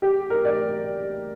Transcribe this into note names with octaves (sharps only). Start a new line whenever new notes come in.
G4
A#4
D5